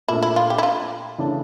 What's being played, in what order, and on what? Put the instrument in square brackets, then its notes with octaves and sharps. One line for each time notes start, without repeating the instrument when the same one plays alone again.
[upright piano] A#2 A3 D4 [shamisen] E4
[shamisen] E4
F4
G4
E4
F4
[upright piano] C#3 E3 A3 D4